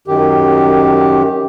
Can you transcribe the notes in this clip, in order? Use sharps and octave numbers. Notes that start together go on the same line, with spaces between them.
F#2 D#3 G4